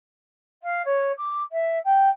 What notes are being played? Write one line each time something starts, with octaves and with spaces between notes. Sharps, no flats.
F5
C#5
D6
E5
G5